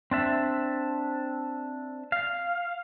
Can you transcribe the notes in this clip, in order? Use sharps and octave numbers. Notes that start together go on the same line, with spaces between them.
C4 D4 E5
F5